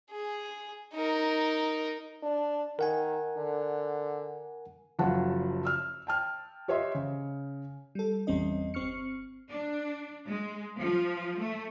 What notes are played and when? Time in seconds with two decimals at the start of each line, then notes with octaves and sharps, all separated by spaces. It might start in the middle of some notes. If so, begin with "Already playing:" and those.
0.11 G#4
0.94 D#4 A#4
2.23 D4
2.79 D#3 A#4 F#5 G#5
3.37 D3
4.99 F#1 F3 F#3 F#5 A5
5.65 E6 F6
6.07 G5 A5 F6
6.68 G4 C5 C#5 D#5 E5 C6
6.95 C#3
7.95 G3 A4
8.27 G#1 E2 G3 C4 C#4 D#5
8.74 G1 C4 C#6 F6 C#7
9.50 D4
10.29 G#3
10.77 F3
11.39 A3